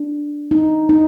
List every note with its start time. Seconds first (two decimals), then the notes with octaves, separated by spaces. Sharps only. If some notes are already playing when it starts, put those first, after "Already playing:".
Already playing: D4
0.51 D#4
0.89 D#4